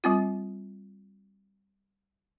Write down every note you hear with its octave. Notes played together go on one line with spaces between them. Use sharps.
G3 C4 F4